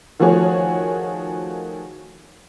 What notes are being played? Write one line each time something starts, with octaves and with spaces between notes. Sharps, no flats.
D#3 F3 A3 F#4 G#4 C#5